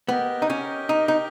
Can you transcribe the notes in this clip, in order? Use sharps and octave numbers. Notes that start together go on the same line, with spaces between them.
B3 G4 A#4 D#5 G5
D#4
C#4
D#4
D#4